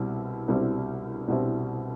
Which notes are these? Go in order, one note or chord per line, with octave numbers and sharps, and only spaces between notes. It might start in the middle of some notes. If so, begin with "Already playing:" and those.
Already playing: C2 B2 G3 C4 E4
C2 B2 G3 C4 E4
C2 B2 G3 C4 E4